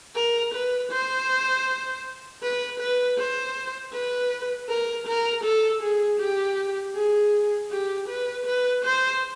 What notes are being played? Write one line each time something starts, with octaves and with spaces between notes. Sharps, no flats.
A#4
B4
C5
B4
B4
C5
B4
A#4
A#4
A4
G#4
G4
G#4
G4
B4
B4
C5